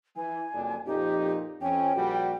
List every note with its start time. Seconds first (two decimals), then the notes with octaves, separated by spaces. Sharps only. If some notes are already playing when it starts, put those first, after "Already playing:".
0.16 E3 G#5
0.53 F#1 F2 D4
0.85 F2 A#2 D#4 G4
1.61 F2 C#4 G5
1.94 A#1 G3 F#4